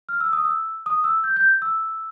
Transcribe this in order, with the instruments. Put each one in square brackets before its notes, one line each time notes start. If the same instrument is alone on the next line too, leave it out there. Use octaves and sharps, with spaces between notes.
[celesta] F6
E6
D#6
E6
D#6
E6
G6
G6
E6